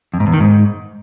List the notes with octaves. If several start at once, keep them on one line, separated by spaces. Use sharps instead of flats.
F2
G#2
E2
D#3
G#2